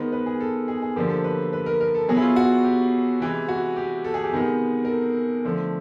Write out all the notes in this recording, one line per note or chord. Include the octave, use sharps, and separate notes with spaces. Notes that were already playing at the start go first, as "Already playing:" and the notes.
Already playing: D#3 G#3 B3 C5
B4
G#4
A4
G#4
G#4
D3 F3 A#3 G4
A4
B4
B4
A#4
A#4
A4
B2 F#3 B3 G#4
E4
F4
F#4
G4
C3 E3 G#3
F#4
G4
A4
G#4
G4
C3 D#3 G#3 B3 G#4
A#4
A4
D3 F3 A3